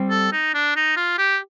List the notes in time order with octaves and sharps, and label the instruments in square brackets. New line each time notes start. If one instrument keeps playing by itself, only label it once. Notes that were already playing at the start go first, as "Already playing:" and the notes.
Already playing: [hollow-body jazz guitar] G3 C4
[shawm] A4
D#4
D4
D#4
F4
G4